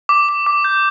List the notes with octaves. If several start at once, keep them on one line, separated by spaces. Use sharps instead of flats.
D6
D6
D6
G6